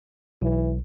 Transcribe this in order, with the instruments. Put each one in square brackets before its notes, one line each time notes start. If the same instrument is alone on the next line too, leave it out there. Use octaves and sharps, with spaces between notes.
[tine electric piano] B1 [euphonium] E3